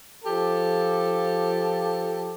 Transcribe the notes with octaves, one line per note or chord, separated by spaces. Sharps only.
F3 G4 A4